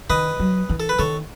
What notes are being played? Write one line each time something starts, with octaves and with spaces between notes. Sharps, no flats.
D#3 B4 D#5
F#3
E3
A4
B4
D#3 A4 C#5